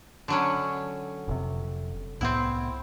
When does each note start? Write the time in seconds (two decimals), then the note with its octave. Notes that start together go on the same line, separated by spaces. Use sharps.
0.28 D3 F#3 C#4
1.28 F1 C3
2.21 C2 A2 B3 C4 E4